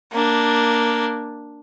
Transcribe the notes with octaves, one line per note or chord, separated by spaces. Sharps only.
A#3 D4